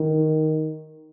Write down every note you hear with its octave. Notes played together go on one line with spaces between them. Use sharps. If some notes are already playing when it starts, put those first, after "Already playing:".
Already playing: D#3